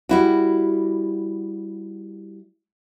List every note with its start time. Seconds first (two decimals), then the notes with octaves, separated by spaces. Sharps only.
0.09 G3 E4 F#4